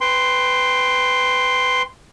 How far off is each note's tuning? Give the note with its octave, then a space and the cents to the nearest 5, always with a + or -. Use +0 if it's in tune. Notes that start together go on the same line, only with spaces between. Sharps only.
B4 +15 G5 +15 C6 +0